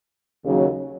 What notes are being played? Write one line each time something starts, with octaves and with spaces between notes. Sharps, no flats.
D#2 C#3 F#3